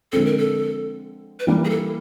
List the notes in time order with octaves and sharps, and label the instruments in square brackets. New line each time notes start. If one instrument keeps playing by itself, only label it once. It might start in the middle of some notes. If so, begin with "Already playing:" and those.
[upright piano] D3 F3 G#3 C4 [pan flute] A4
[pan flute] A#4
A4
B4
[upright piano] E3 G3 A#3 [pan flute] A#4
[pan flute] G#4
A4